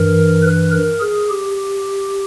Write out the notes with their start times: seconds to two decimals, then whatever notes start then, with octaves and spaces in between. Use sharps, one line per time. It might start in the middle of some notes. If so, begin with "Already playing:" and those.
Already playing: G2 E3 A#4
0.43 B4
0.72 A#4
1.00 G#4
1.29 G4